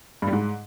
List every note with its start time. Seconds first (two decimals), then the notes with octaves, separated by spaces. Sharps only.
0.22 G2
0.27 G3
0.33 G#2